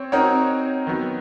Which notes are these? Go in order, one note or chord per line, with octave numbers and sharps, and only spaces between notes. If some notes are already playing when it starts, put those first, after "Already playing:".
Already playing: C4 C#5
C4 D#4 F#4 A#4 C#5
D#3 F#3 B3